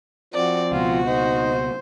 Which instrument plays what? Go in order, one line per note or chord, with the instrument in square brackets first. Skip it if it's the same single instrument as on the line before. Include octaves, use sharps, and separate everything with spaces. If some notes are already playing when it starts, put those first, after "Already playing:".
[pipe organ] F3 C4 [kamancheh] F#4 D5
[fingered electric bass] C#2 B2 [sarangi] F4 [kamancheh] F#4
[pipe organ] D#4 [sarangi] C5